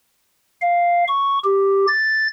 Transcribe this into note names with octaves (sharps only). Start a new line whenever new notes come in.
F5
C#6
G4
A6